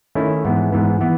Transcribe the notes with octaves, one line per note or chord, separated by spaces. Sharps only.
D#3 A3 C#4 E4
G#2 E3 B3
G#2 E3 B3
E3 B3